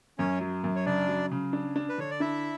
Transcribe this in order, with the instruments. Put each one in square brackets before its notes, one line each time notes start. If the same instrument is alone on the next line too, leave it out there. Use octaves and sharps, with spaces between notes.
[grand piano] F#2 [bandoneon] C#4 C#5
[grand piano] F#3
F#2
[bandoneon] C#5
[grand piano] C#3 [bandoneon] D4 D5
[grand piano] F#3
C#3
D4
D4
[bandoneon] B4
[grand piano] D3 [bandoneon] C#5
[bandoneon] D5
[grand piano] D4 [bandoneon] E4 E5